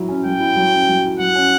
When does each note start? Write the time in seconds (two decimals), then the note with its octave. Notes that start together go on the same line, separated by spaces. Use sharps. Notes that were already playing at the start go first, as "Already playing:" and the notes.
Already playing: F#3 E4
0.09 C#4
0.25 F#3 G5
0.40 E4
0.56 F#3
0.72 C#4
0.88 F#3
1.04 E4
1.19 F#3 F#5
1.35 C#4